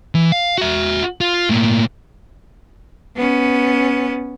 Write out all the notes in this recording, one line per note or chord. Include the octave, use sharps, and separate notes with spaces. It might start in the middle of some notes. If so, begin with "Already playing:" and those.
E3
F5
F#4 E5
F4
A2 A#3
B3 C#4